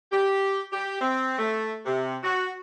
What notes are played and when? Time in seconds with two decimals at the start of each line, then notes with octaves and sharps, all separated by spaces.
0.12 G4
0.72 G4
1.01 C4
1.38 A3
1.86 C3
2.23 F#4